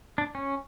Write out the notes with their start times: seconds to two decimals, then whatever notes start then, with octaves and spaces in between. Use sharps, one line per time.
0.18 D4
0.35 C#4